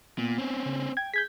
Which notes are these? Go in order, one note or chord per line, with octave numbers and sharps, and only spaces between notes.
A#2 B3
C4 C#4
C#3
G5 G#6
G#4 G6 G#6 B6